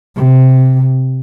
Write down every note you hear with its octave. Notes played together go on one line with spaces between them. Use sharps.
C3